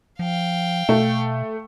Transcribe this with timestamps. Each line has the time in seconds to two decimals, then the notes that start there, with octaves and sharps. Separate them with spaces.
0.19 F3 F5 G5
0.89 B2 A3